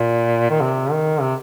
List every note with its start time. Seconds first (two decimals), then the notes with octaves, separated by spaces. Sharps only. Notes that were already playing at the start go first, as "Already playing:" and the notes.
Already playing: A#2
0.50 D#3
0.61 C3
0.91 D#3
1.21 C3